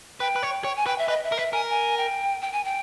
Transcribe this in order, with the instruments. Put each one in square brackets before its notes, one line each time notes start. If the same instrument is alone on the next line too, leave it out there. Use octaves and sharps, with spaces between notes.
[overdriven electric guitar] B4 [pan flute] G5
[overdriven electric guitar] B4
C#5
C#5
[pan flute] G#5
[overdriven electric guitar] B4 [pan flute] G5
[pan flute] E5
[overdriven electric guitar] B4 [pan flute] D#5
[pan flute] E5
[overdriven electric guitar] A#4
[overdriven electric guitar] B4 [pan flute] E5
[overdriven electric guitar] A#4 [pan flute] G#5
[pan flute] G#5
G5
G5
G#5
G5